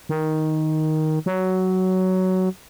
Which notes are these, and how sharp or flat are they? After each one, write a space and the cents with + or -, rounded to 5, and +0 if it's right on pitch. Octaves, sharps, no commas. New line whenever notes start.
D#3 +5
F#3 +10